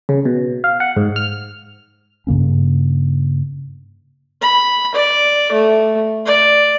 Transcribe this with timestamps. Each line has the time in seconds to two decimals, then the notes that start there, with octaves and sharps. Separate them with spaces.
0.09 C#3
0.25 B2
0.64 F5
0.80 F#5
0.97 G#2
1.16 F6
2.27 G2 C#3 A#3 C#4
4.42 B5
4.94 D5
5.52 A3
6.26 D5